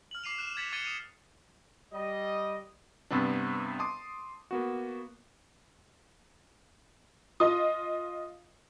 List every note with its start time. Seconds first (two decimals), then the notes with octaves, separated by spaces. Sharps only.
0.11 F6 F#7
0.24 D6 C7 D#7 F7
0.38 F#6 E7
0.57 G#6 A6 B6 C#7 F#7
0.72 D6 G#6 A6 C#7 D#7 G7
0.84 D#6 D#7 F7
1.93 G3 D#5
3.11 G2 C3 B3 C4 D4
3.79 A5 C6 D6 D#6
4.51 A#3 B3 F#4
7.40 F4 D#5 D#6